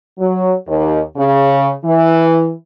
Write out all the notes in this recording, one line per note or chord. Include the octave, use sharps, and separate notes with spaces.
F#3
D#2
C#3
E3